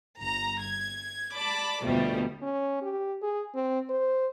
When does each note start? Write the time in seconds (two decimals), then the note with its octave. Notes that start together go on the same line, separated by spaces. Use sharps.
0.20 G1 A#5
0.62 G#6
1.34 D5 A5 B5 D6
1.83 D2 B2 F3 G3 A3 A#3
2.42 C#4
2.82 G4
3.22 G#4
3.55 C4
3.89 C5